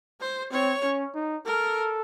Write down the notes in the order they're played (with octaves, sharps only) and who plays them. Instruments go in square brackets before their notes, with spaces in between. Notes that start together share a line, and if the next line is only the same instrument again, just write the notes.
[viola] C5
[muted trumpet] C4 [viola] C#5
[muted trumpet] C#4
D#4
[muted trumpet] A4 [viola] A#4